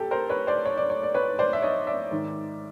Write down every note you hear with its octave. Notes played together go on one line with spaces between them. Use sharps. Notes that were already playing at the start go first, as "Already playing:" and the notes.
Already playing: F#2 G4 A4
A#4 C5
B4 C#5
C5 D5
C#5
D5
C#5
D5
B4 C#5
C5 D5
E5
C#5 D#5
D5 E5
G#2 D#3